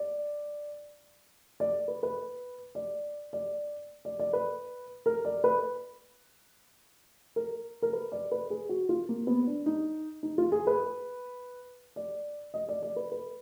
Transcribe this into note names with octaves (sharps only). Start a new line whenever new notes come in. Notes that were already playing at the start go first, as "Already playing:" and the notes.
Already playing: D5
D5
B4
B4
D5
D5
D5
D5
B4
A#4
D5
B4
A#4
A#4
B4
D5
B4
G#4
F#4
F4
A#3
B3
D4
D#4
D#4
F4
G#4
B4
D5
D#5
D5
D5
B4
B4